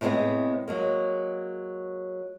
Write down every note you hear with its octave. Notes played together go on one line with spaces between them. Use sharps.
A2 C3 G3 G#3 B3 C4
F#3 G#3 A#3